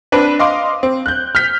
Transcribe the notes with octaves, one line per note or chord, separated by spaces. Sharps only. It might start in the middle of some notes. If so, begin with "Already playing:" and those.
C4 D4 B4
D#5 F5 C6 D6
C4
F#6 G6
F6 G6 B6